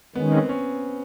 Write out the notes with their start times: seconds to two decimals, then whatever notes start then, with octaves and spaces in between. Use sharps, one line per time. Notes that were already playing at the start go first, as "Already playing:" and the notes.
0.15 D#3 G#3 B3 C#4
0.32 C4
0.49 C#4